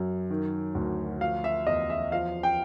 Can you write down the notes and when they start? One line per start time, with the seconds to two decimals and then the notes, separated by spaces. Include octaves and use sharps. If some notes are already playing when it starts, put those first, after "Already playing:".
Already playing: F#2 F#3
0.30 D#3
0.75 D2
1.21 F3 F5
1.44 E5
1.67 E2 D#5
1.90 E5
2.12 F3 F5
2.43 G5